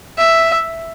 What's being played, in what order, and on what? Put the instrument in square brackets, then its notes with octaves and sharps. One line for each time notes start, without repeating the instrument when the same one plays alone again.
[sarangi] E5